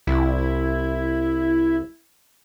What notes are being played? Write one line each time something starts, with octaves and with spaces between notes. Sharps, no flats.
C2 E4